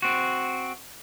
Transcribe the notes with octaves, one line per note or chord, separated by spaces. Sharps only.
C4 F#4